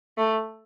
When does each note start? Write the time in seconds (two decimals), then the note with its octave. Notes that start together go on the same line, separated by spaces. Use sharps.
0.18 A3